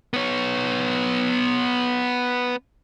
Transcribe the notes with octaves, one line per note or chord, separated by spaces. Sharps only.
B3 C#5